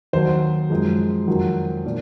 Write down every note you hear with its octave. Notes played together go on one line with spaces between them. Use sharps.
D#2 D#3 F#3 C5
F#2 F3 G#3
F2 D#3 F#3
A#2